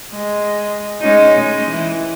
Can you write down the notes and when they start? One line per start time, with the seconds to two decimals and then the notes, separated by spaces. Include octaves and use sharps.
0.11 G#3
1.00 G#3 C#4 D#4
1.36 G#3
1.69 E3